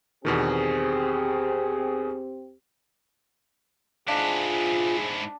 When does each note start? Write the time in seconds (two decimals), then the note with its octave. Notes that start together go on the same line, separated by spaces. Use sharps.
0.25 E2 B2 D#3 C4 G4 G#4
4.08 G#2 D4 E4 F4 G#4